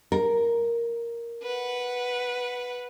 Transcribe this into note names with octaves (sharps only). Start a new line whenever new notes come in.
A#4
B4 F#5